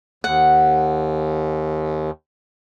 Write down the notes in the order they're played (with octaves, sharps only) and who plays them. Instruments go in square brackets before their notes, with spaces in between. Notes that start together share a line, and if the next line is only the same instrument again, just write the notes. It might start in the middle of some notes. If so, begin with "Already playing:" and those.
[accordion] D#2 [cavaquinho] F#5